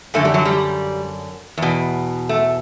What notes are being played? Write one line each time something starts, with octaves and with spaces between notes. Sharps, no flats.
F#2 D3 A3
G3
F#3
G3
E2 B2
A3